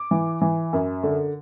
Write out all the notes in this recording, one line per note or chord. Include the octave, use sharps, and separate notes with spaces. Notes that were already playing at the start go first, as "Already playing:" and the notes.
Already playing: D6
E3
E3
F#2
D3